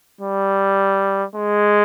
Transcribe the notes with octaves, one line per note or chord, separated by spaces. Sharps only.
G3
G#3